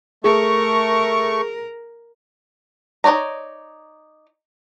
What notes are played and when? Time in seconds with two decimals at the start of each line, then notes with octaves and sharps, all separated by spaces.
0.24 A3 G#4 A#4 C#6
3.04 D#4 A#4 C#5 D5 A#5